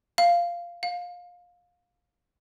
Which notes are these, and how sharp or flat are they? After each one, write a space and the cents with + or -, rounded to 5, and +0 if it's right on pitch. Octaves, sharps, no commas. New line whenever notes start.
F5 -10
F5 +20